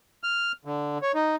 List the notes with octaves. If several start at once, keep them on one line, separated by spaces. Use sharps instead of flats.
F6
D3
C#5
D#4